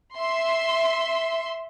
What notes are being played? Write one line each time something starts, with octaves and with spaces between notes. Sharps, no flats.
E5 C6